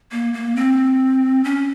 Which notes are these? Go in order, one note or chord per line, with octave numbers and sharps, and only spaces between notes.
A#3
A#3
C4
C#4